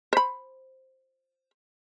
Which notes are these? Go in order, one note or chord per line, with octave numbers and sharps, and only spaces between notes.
C5 B5